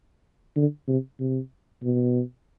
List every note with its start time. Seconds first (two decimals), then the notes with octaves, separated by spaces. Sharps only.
0.56 D3
0.88 C3
1.20 C3
1.83 B2